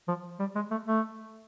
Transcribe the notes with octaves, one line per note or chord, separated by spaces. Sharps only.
F3
G3
G#3
A3
A3